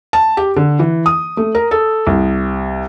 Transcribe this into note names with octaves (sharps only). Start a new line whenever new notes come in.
A5
G4
D3
E3
D#6
A3
A#4
A4
C2